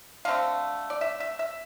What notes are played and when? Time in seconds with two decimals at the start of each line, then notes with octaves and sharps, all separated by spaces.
0.25 D3 A3 C4 F5
0.90 D5
1.01 E5
1.20 E5
1.39 E5